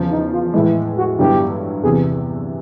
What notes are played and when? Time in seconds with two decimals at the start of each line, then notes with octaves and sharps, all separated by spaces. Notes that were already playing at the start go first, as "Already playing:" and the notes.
Already playing: E2 C#3 F3
0.11 D#4
0.33 F4
0.54 A2 E3 G#3 E4
0.97 F#4
1.19 G2 D3 F#3 B3 E4 G4
1.83 E2 C3 E3 G#4